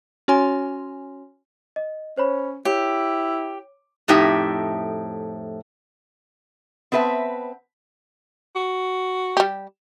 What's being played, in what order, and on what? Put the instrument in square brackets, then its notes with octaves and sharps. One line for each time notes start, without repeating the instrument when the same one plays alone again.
[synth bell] C#4 F#4 C#5 G#5 C6
[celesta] D#5
[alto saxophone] C#4 [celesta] C5 C#5 B5
[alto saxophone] E4 [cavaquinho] G4 [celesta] C#5
[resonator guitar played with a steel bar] F2 A2 D#4 G4 E5
B3 C4 B4 E5 A5
[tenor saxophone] F#4
[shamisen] G3 G4